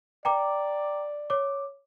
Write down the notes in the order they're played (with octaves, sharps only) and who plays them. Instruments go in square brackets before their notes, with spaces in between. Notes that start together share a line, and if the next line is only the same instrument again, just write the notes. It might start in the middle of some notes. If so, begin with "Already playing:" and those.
[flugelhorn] D5 [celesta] G5 A#5 D6
[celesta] C#5 D6